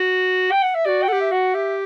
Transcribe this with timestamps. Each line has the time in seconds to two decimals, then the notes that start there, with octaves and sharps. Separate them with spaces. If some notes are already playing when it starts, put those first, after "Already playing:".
Already playing: F#4
0.51 G5
0.63 F#5
0.75 E5
0.85 F#4 G4 D5
1.03 G5
1.08 A4 F#5
1.12 G4
1.21 E5
1.31 F#4 F#5
1.54 G4 E5